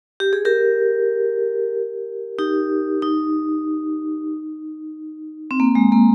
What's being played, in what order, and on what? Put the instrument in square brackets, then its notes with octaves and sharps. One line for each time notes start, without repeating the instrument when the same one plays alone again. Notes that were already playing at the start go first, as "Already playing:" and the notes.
[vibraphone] G4
G#4
G4 A#4
D#4 G4
D#4
C4
A#3
G#3
A#3